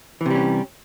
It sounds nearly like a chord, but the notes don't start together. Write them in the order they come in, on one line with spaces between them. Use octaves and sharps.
E3 C3 G3 C#4